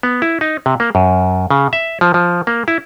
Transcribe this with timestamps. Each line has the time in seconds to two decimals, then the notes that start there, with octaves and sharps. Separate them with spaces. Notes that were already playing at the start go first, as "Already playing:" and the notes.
0.03 B3
0.22 E4
0.41 D#4
0.66 C3
0.80 A#3
0.95 F#2
1.51 C#3
1.73 E5
2.01 F3
2.14 F3
2.47 A#3
2.68 E4